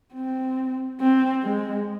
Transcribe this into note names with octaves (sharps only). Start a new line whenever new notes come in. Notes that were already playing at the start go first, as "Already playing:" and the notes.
C4
C4
G#3